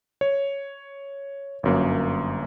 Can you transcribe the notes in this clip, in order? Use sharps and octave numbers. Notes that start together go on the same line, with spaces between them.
C#5
G1 F#2 A#3